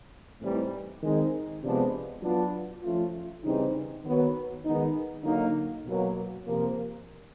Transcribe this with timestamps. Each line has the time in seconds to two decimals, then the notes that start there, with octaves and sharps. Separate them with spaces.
0.40 A2 E3 G3 C4 D#4
1.00 D#3 G#3 C4 D#4
1.61 C3 F3 G#3 B3 D4
2.22 F#3 B3 D4 F4
2.82 F3 A3 C#4 F4
3.43 C#3 E3 G3 C4 D#4
4.04 D#3 F#3 B3
4.64 D#3 G#3 B3 D#4
5.24 D3 F#3 A#3 D#4
5.84 B2 F#3 A#3
6.44 C3 F3 A#3